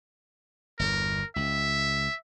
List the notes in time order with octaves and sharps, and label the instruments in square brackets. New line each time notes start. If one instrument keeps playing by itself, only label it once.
[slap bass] G1 E2 [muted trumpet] A#4
[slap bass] C#2 [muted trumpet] E5